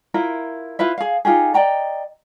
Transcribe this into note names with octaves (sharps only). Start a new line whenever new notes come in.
E4 F4 A#4 E5
E4 F4 B4 E5
G#4 F5
D#4 F4 G4 G#4
D5 D#5 G5 A#5